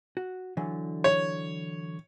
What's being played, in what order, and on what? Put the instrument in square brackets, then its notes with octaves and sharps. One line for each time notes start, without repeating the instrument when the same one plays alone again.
[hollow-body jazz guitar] F#4
D3 E3 F#3
[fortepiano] C#5